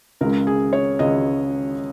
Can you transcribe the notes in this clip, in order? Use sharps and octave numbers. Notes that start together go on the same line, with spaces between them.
C#2 C#3 G#3 A#4
G#4
C#5
C#2 C#3 G#3 D#5